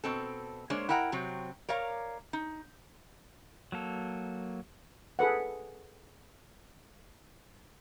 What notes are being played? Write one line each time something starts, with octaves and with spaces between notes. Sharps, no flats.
B2 C4 A4
G#3 A#3 D4 C5 C#5
E4 A#4 F#5 G5 A#5
C3 F#3 C4
A#4 C#5 D5 F5 A#5
D#4
F#3 A#3 A4
G#4 A4 B4 F#5